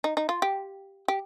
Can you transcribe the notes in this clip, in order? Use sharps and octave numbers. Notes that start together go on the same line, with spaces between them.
D#4
D#4
F4
G4
G4